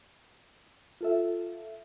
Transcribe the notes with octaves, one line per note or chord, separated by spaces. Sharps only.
F4 A4 E5